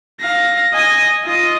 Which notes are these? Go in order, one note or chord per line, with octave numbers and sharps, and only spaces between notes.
F5 A#6
D#5 G#5
F4 D#5